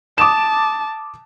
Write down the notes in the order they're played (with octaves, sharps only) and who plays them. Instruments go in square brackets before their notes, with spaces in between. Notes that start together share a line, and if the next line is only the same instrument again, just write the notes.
[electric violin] A5 [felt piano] D6 D#6 E7